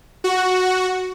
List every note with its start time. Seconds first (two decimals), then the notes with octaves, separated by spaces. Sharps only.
0.24 F#4